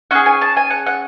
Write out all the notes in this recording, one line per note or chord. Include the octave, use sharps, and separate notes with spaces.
C#4 G#4 F#5
G#5
A5
G#5
F#5
F#5